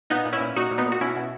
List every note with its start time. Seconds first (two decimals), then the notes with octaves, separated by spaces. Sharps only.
0.10 A#2 B3 D#4
0.25 A#2
0.33 C#4 E4
0.40 A#2
0.56 A#2 D#4 F#4
0.71 A#2
0.78 B3 D#4
0.86 A#2
0.92 F#4
1.01 B2 C#4 E4
1.17 B2